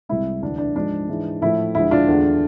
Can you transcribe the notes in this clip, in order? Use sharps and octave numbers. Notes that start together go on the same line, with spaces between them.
C2 C3 G#3 E4
D2 C3 E3 D4
D4
G#2 F3 G#3 D4
G#2 E3 G#3
A2 F3 A3 E4
D2 D3 F3 G#3 E4
D4 F4
E2 D3 A3